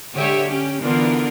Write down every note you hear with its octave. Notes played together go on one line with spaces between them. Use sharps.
D3 G#3 G4 C#5 E5
C#4 G4
D3 E3 B3 D4 F4 A#4